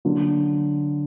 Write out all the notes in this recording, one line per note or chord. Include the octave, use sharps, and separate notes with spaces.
D3 F#3 A#3